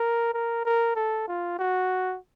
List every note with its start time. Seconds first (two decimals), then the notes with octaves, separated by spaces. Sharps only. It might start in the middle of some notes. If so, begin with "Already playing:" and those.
Already playing: A#4
0.34 A#4
0.65 A#4
0.96 A4
1.28 F4
1.59 F#4